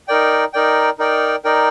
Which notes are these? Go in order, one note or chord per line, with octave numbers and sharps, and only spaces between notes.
D#4 A#4 D5 G5
D#4 A#4 D5 G5
D#4 A#4 D5 G5
D#4 A#4 D5 G5